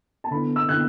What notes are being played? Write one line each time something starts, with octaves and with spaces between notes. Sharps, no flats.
A5
D3 B3 E4 B5
E6
D3 B3 E4 F#6